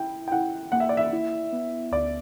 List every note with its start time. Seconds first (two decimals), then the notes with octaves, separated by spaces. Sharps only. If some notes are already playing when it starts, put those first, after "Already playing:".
Already playing: E4 G5
0.28 G5
0.32 E4 F#5
0.72 A#3 F#5
0.80 E5
0.89 D5
0.97 E5
1.12 E4
1.52 B3
1.92 D2 D5